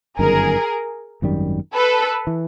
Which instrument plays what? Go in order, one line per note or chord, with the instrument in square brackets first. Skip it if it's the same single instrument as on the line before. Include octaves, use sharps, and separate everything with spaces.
[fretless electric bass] G1 F#2 D#3 [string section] G#4 A#4
[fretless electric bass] G#1 F#2 D#3 G3
[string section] A4 B4
[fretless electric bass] E3